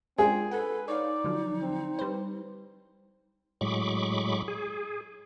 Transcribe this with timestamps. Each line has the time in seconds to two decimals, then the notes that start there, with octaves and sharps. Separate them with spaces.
0.18 G#3 C4 D4 F4 G#4 G5
0.51 A4 B4 F#5 G#5
0.88 D#4 C#5 D5 F5
1.24 D3 F3 F#3
1.62 C4
1.99 G3 B4 C5
3.61 A2 F#3 G#3 B5 C#6 D6
4.48 G#4